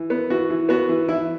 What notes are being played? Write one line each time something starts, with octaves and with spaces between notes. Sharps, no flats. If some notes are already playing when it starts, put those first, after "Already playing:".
Already playing: E3
B3
E3 F#4
E3
B3 F#4
E3
E3 E4